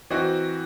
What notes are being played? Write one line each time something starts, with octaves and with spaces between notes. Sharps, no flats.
E3 C4 D#4 F#4